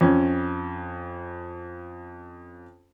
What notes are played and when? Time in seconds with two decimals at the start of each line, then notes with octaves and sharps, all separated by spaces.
0.01 F2 C#4